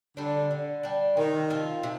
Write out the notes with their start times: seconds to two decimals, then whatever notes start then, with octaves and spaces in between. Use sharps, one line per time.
0.17 D3 G3 D4
0.51 D3
0.83 G3 D4
1.17 C3 D#3
1.50 F3 C4 F4
1.83 C3